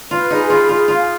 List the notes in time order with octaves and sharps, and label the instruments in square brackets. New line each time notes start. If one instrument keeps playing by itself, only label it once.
[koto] F4 [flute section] B4
[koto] D#4 [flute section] G#4
[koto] F4 [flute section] B5
[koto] F4 [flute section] G#4
[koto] F4 [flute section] F5